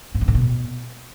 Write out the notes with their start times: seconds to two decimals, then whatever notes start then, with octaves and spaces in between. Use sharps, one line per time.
0.15 G#2
0.21 D3
0.28 A2
0.35 B2